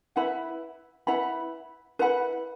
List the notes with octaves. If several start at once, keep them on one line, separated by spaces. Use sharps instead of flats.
E4 B4 F#5 B5
E4 B4 F#5 B5
E4 B4 F#5 B5